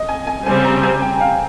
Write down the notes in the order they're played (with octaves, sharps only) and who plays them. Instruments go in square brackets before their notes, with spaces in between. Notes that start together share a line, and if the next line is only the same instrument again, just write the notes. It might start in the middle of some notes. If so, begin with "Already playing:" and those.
Already playing: [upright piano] D#5
G#5
G#5
[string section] C#3 G3 C4 [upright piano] G#5
[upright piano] A#5
G#5
G5
F5